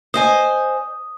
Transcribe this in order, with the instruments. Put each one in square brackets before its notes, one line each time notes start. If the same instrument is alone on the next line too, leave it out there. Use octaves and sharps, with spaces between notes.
[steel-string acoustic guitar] C5 D#5 G#5 [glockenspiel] D#6